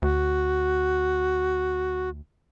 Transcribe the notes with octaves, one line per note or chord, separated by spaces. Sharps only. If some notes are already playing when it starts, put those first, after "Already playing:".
D2 F#4